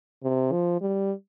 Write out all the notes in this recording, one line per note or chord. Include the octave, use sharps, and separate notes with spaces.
C3
F3
G3